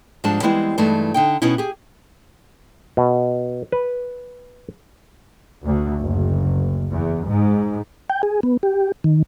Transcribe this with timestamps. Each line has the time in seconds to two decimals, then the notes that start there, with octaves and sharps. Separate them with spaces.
0.24 G#2 F3 G3 G#3 D4 A5
0.42 E3 G3 G#3 B3 C4 E4
0.78 G2 E3 G#3 A3 D#4
1.14 D3 D#4 G5
1.42 B2 B3 C#4 D#4 E4
1.58 G4 G#4
2.97 B2
3.72 B4
5.63 D2
5.99 F#1
6.91 E2
7.26 G#2
8.10 G5
8.23 G#4
8.43 B3
8.63 G4
9.04 D#3